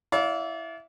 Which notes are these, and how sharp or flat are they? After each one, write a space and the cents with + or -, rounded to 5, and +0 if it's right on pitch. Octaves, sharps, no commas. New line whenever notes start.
E4 +0 D5 -30 F5 +25